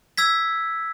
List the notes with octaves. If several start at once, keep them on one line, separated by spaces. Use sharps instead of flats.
E6 G#6 B6